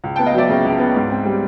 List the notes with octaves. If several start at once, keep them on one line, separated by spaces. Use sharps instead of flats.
C#2
B3 G5 A5
D#5 F5
F#3 D5 E5
C#3
C#2
B3
G#2
C4
G3